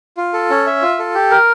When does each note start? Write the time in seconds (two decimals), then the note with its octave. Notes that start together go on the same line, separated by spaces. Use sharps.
0.17 F4
0.33 A4
0.50 C#4
0.66 E5
0.82 F4
0.99 A4
1.15 G4
1.31 A#4